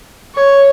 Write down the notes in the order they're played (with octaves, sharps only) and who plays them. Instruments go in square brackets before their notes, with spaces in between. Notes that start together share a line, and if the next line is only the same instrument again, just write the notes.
[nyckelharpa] C#5